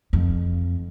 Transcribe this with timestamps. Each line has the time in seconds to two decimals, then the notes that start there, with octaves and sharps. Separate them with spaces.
0.13 F2